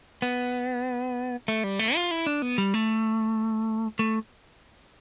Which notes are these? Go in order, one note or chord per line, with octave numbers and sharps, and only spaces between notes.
B3
A3
G3
A3
F4
E4
D4
B3
G3
A3
A3